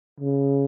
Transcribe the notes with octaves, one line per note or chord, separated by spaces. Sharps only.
C#3